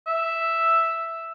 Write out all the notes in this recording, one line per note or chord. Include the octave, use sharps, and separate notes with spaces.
E5